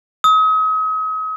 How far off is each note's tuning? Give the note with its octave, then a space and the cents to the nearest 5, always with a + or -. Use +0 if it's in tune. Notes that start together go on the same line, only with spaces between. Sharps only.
D#6 +40